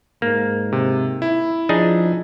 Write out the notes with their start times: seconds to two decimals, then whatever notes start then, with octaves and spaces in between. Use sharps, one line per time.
0.22 G#2 A#3
0.72 C3
1.22 E4
1.69 F3 D4 D#4 G#4